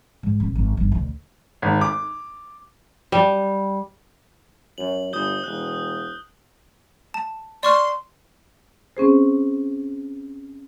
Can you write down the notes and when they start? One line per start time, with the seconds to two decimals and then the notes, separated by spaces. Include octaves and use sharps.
0.23 G#2
0.40 D#1
0.55 G#1
0.77 G1
0.92 D2 B2
1.62 G#1
1.81 D6
3.12 G3
4.78 F#2 F#7
5.13 G1 D#6 G6 G7
5.44 E1 F#6
7.14 A5
7.63 D5 C6 C#6 F6
8.97 C4 C#4 G#4 C5